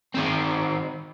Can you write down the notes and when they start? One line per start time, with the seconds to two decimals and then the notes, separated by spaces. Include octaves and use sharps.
0.14 D#3 C4